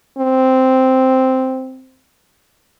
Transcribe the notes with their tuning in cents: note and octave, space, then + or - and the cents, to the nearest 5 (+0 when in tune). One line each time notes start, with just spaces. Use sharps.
C4 -5